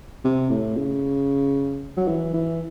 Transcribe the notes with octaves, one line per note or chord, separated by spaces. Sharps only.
C3
A2
C#3
F#3
E3
E3